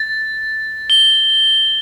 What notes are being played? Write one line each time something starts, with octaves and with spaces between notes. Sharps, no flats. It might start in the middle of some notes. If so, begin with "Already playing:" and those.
Already playing: A6
G7